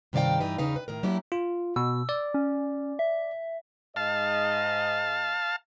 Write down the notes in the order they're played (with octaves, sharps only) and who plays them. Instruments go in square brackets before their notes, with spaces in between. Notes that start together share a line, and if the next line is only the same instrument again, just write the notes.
[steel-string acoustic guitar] G2 C3 D#3 D5 F5 G5
G2 E3 D#4 B4
E2 C#3 D#4 B4 F5
B4
A2 D#3 A#4
F#3 A#3 D4 E4 G4
[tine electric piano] F4
[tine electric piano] B2 [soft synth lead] E6
[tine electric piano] D5
[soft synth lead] C#4
E5
[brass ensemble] G#2 D#5 [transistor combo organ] F5 A5